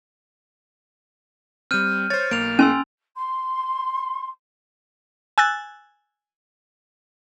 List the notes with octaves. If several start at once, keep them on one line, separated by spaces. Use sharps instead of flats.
G3 C4 F6 G6 D#7
C5 C#5 A6
B1 A#3 D7 F7
C#4 G#5 C6 E6
C6
G#5 E6 F#6 A6